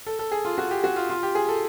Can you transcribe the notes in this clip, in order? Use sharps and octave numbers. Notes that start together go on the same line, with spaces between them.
A4
A4
G#4
F4
F#4
G4
F#4
F4
F4
G4
G#4
A4